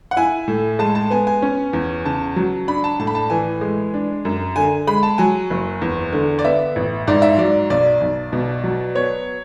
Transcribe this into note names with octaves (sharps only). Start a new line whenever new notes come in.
F#5
E4 G#5
A2
G#3 A5
A5
B3 G#5
G#5
C#4
E2
C#3 A5
F#3
D4 B5
A5
A2 A5
B5
A5
E3 G#5
G#3
D4
F#2
D3 G#5
G#3 B5
A5
F#3 G#5
F#1
E2
D3
D5
B3 E5
A1
G#2 D5
E5
F#3 D5
B1 D5
B1
B2
F#3
B3 C#5